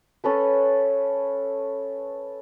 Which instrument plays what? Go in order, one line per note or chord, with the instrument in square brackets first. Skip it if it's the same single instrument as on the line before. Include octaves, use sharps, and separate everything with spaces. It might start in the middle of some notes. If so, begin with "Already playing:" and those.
[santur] C#4 A4 B4